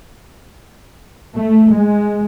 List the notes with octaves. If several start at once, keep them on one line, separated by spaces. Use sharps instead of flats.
A3
G#3